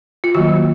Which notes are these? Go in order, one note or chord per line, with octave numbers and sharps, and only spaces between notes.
F4
D#3 F#3 A#3 F#4